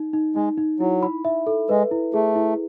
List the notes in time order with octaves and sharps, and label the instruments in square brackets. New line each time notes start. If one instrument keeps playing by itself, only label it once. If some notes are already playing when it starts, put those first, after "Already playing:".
Already playing: [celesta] D#4
D#4
[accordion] G#3 [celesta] D#4
[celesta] D#4
[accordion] F#3 [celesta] E4
[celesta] B5
E5
A4
[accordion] G#3 [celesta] B4
[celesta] E4
[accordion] A3 [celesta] G#4
[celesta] E4